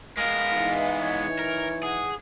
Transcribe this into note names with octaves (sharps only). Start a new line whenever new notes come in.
G#3 B3 A#4 F5
E3 D#4
C#5
A#4
G#4 F#5